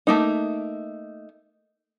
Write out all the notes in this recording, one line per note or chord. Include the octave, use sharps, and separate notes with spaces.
A3 A#3 D#4